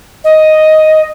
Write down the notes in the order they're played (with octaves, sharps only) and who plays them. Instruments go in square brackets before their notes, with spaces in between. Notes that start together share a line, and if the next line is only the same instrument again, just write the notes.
[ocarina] D#5